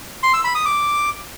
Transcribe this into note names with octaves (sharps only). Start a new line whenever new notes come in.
C6
E6
B5
D#6
D6